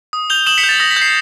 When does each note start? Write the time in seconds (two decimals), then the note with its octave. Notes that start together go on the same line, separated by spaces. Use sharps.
0.13 D#6
0.30 G6 F7 G7
0.46 D#6 E7 F#7
0.58 B6 C#7
0.64 G6
0.69 A6
0.80 D#6 A#6
0.91 B6
0.96 G6
1.02 C7